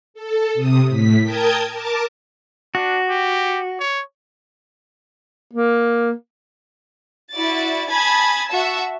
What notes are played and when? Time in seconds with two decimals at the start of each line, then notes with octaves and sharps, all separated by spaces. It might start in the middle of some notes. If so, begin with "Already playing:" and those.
0.14 A4
0.54 C3 D#6
0.89 A2 B6
1.22 A#4 G5 A5 D#6 G6 G#6
1.72 A#4 A5 D6
2.75 D4 F#4
3.09 G4
3.79 C#5
5.53 A#3
7.32 E4 F#4 D5 A6
7.90 G#5 A5 B5 D#6 G#6 A6
8.48 F#4 E5 A5 E6